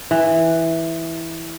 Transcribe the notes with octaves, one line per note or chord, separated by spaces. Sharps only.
E3